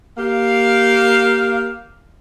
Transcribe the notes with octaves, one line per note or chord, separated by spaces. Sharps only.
A#3 G4 F5